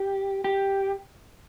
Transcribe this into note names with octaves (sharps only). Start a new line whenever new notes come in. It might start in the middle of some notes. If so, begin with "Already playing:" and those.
Already playing: G4
G4